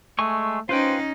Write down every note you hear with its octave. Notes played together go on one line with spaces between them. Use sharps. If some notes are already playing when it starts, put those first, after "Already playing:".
G#3 A3 G#5 C#6
C#4 D#4 F4 B4 C5 G5